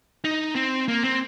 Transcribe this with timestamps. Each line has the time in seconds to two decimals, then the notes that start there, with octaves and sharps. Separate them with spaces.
0.24 D#4
0.55 C4
0.88 A#3
1.03 C4